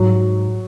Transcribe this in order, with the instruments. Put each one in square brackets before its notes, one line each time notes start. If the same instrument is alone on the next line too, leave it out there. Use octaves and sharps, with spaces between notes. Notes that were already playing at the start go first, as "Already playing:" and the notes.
Already playing: [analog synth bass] G#2 [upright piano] F#3